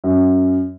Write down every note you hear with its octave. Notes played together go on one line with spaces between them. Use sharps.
F#2